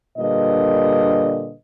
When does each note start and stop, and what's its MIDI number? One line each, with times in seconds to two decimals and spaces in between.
0.18 1.53 46
0.18 1.53 50
0.18 1.53 55
0.18 1.53 62
0.18 1.53 71
0.18 1.53 75